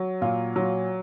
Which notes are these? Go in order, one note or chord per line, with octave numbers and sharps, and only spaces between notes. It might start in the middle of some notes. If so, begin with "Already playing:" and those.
Already playing: F#3
A#2 F4
F#3